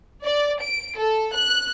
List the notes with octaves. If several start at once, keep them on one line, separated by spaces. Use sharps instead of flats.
D5
D7
A4
F#6